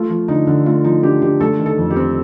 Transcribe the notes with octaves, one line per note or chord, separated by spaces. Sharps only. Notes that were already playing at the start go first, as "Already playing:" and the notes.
Already playing: A3 F4
F3
D3 D#4
D3
A3 F4
F3 D#4
D3 G4
D3 G4
A3 A4
D#3
A4
F2
G4
C4